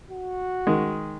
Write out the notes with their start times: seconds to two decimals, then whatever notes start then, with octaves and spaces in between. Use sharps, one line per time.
0.11 F#4
0.67 D#3 G#3